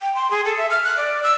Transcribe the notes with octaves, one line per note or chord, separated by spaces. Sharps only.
G5
C6
G#4
A4
E5
F6
F#6
D5
E6